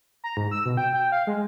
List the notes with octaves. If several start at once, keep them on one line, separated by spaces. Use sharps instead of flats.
A#5
G#2
E6
B2
G5
G5
F5
G#3